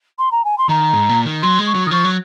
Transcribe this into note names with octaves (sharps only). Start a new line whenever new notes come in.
C6
A#5
G#5
C6
D#3 A#5
G#2
A#2
D#3
F#3 C6
G#3
C#6
F#3
D#3 D#6
F3 C#6
F#3